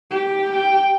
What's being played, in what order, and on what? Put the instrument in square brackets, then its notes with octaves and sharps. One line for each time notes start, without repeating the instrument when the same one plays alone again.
[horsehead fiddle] G4
[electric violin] G5